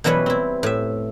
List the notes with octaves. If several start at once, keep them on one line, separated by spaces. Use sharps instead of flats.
B2 E3 F#3 G3 B4 C#5
C4 E4
A2 E5